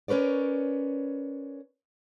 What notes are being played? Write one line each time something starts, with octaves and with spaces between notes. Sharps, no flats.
C#4 A#4 B4 C#5 D5